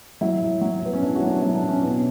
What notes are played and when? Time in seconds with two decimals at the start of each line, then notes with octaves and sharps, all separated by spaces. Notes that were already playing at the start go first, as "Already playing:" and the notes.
0.21 F#3 E4
0.41 A2
0.61 F#3
0.82 A2 B3
0.93 C#4
1.02 A2 D4
1.16 F#4
1.22 F#3
1.29 D4
1.42 F#3 E4
1.55 D4
1.63 A2
1.69 C#4
1.82 B2 C#4